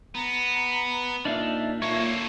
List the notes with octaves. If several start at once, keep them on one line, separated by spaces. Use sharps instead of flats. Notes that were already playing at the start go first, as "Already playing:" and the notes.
B3 A#5
A#2 D4 D#4 E5 F5
A#2 A#3 A4 C#5